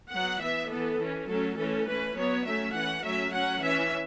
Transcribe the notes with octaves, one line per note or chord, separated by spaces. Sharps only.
F#3 B3 F#5
E3 B3 E5
E3 B3 A4
E3 C#4
F#3 A3 C#4 A4
E3 A3 C#4 A4
E3 A3 C#4 B4
F#3 B3 C#5
F#3 A3 C#4 E5
E3 C#4 F#5
F#3 A3 C#4 E5
F#3 C#4 F#5
E3 C#4 E5